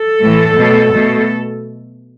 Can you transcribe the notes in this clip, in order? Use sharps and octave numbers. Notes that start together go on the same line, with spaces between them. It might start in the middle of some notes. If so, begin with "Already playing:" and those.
Already playing: A4
A2 E3 A3
B2 F#3 A3
B2 A3